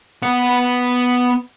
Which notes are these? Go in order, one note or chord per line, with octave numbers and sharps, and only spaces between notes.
B3 F#5